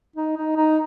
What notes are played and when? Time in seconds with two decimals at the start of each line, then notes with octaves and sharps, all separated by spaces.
0.16 D#4
0.37 D#4
0.56 D#4